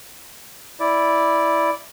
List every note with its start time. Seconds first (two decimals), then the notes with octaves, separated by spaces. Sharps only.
0.80 E4 D5